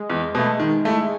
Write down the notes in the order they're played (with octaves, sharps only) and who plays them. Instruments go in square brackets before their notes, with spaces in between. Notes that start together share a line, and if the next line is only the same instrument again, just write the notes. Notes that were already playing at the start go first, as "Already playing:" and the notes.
Already playing: [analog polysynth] G#3
[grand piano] E2
B2 A3
D#3
A3 E4